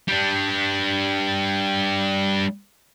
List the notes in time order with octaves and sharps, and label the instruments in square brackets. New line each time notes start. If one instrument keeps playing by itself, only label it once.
[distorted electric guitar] G3 D4